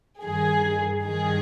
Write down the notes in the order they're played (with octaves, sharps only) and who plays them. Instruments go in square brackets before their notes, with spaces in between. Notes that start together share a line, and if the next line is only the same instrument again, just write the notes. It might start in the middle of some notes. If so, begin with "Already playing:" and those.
[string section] G2 D#3 G#4
G2 D#3 G#4